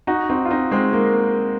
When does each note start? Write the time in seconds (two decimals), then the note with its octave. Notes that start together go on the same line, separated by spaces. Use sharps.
0.07 D#4 F#4
0.29 C4 D#4
0.45 F4
0.51 C4 D#4
0.71 G#3 C4
0.93 A#3